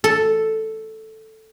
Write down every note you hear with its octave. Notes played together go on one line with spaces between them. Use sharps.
A4